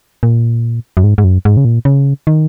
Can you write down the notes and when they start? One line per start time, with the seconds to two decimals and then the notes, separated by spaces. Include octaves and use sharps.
0.23 A#2
0.97 F#2
1.04 G#2
1.18 G#2
1.24 F#2
1.45 G#2
1.57 C#3
1.65 A#2
1.85 C#3
2.27 D#3